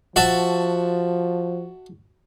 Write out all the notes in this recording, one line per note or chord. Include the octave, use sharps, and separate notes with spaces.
F3 F#4 E5 A5